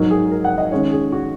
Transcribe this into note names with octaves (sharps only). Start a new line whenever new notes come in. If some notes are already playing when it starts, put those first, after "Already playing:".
Already playing: G#2 F#3 D#4 A#4
G#4
A#4
F#5
D#5
D#3 G#3 C#4 C#5
G#4
F#4